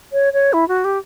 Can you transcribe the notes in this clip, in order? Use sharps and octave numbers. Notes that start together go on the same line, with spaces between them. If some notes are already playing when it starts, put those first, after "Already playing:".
C#5
C#5
E4
F#4
G4